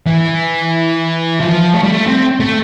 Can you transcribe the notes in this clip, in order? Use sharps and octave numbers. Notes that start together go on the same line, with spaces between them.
E3
F3
A3
G3
A3
C4
A3